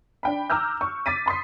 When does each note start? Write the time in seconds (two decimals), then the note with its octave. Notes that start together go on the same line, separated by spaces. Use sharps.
0.23 D4 G5 B5
0.50 A#5 D6 E6 F6 G6
0.81 C#6
1.06 D6 A6 B6 D#7
1.26 B5 C6 D#6 B6